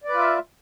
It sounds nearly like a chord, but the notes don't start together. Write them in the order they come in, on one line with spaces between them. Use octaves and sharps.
D5 B4 F4 E5